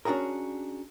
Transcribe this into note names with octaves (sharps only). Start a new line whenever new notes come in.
C#4 D4 F#4 G#4 A#4